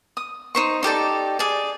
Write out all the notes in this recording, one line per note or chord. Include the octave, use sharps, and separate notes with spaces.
D#6
D#4 C5 C#6
D#4 G4 A4 D5
G#4 D5